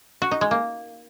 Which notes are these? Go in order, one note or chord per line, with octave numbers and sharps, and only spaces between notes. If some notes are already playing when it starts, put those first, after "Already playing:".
F#4
D#4
G#3
A#3